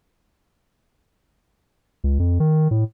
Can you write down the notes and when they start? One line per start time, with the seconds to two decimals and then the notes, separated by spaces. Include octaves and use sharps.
2.04 C#2
2.19 F2
2.40 D#3
2.71 A2